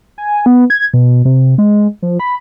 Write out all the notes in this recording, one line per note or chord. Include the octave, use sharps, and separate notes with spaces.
G#5
B3
G#6
B2
C3
G#3
F3
B5